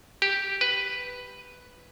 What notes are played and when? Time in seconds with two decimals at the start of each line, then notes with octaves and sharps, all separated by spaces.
0.22 G4
0.61 B4